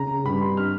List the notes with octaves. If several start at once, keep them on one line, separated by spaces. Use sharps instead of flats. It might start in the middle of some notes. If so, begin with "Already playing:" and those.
Already playing: C#3 A#5
G2 B5
C6
F6